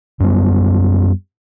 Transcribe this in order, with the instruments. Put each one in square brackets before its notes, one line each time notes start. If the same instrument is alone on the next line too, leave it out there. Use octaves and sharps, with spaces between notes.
[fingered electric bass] F#2 G3 G#3 B3